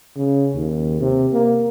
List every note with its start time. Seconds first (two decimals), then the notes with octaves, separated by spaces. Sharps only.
0.16 C#3
0.55 D#2
1.01 C3
1.33 A#3